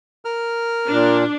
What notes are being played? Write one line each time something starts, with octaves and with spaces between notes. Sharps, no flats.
A#4 F6
A#2 D4